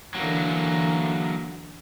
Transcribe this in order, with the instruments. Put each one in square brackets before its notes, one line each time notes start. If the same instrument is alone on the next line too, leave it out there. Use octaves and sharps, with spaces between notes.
[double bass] D3 E3 [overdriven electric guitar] F#3 A#3